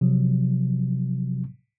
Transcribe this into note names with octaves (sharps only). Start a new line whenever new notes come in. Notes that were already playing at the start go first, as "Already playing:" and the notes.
C3 F3 F#3